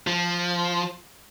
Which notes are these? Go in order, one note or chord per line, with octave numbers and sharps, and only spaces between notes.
F3